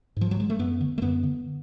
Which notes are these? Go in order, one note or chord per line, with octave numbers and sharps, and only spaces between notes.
G#2 F3
F#3
G#3
A3
F#2 B3
D3
A3
F#2 B3
D3